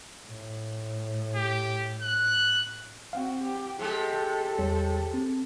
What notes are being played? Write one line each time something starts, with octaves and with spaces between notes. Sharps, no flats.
A2
G4
F#6
C4 F#4 F5 F#5
G4
C3 G#3 G4 A4
E2 G3 C#5
C4